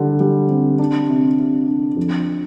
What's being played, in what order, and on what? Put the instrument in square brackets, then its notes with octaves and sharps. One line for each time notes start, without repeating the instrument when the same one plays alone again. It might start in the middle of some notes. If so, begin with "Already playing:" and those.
Already playing: [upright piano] D3 G3
G3
C4
D4
C3
C3
D4
F2